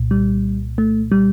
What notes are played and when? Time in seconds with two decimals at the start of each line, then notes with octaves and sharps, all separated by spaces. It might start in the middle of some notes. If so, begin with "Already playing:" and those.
Already playing: C2 A#2
0.11 G3
0.78 A3
1.12 G3